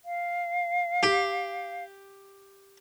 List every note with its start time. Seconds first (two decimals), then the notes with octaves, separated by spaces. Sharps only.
0.05 F5
1.03 G4